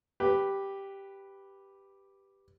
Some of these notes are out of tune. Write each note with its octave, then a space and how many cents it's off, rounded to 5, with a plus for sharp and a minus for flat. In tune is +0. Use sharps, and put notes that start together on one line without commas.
G4 +0 B4 +0